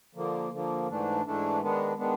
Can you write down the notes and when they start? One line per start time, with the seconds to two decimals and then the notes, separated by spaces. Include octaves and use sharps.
0.15 D3 F3 A#3
0.51 D3 F3 A#3
0.88 G#2 E3 A3 D4
1.24 G#2 E3 A3 D4
1.61 D#3 G#3 B3 D4
1.97 D#3 G#3 B3 D4